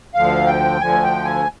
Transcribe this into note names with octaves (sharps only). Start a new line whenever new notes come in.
D2 D3 F3 F5
G5
D2 D3 F3 G#5
G5
G#5